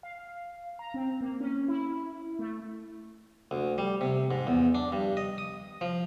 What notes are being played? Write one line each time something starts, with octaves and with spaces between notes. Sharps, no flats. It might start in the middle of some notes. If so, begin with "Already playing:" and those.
F5
A#5
C4
A#3
C#4
E4
A3
D2
G3
C3
G#2
E2
D4
G2
D#5
D#6
F3